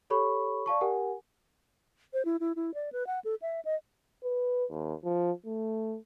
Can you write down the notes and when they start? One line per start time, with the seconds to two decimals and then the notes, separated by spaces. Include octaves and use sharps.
0.10 G4 A4 C#5 B5 C#6
0.66 D5 F5 A5 C#6
0.81 G4 A#4 F#5 G#5
2.14 C5
2.25 E4
2.40 E4
2.56 E4
2.74 D5
2.92 B4
3.07 F#5
3.25 A4
3.42 E5
3.65 D#5
4.24 B4
4.71 D#2
5.04 F3
5.46 A3